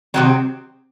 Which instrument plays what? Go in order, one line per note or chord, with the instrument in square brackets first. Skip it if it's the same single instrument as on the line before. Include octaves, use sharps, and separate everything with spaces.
[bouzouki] C3 D#3 F#3 C4